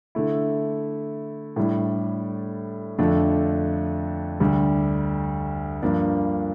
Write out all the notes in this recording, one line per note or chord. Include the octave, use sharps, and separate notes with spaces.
D3 A3 E4
A2 G3 D4
F2 D3 A3 D4 F4
D2 D3 G3 D4
G2 F3 A#3 D4